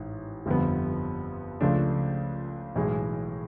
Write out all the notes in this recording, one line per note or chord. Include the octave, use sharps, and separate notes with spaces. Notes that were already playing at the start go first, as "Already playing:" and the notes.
Already playing: A1 G#2
G1 F2 D3 G3 B3
C#2 C#3 F3 A3 D4
B1 A2 E3 G#3